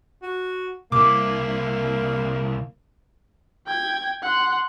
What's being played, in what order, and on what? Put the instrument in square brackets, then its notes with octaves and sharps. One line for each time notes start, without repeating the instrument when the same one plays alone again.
[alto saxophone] F#4
[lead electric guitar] C2 E4 [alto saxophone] A#3 [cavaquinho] D6
[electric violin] G5 G#6
F#5 C6